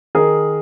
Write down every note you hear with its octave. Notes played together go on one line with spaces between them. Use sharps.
D#3 G#4 A#4